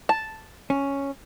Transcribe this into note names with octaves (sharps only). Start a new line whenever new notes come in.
A5
C#4